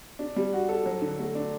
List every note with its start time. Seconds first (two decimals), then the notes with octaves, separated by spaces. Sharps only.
0.19 D4
0.36 G3
0.53 F#4
0.69 A4
0.86 F#3
1.02 D3
1.19 A3
1.35 D4